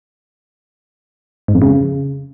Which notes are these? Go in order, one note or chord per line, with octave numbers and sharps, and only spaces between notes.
G#2
F2
C#3